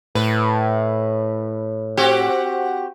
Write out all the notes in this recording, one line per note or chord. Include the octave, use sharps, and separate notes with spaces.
A2 B4
C4 F#4 G4